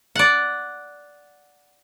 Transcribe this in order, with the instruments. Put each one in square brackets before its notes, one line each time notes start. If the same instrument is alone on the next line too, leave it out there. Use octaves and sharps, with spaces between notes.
[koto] D5 F#5